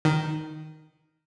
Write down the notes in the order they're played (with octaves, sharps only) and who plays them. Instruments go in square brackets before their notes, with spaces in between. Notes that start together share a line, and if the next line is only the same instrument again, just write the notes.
[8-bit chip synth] D#3